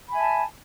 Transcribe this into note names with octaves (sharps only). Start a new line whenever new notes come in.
E5 G#5 A5 B5